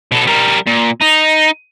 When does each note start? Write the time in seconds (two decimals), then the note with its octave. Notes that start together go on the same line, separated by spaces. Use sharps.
0.12 B2 A4
0.27 G3 A#4
0.67 A#2
1.01 D#4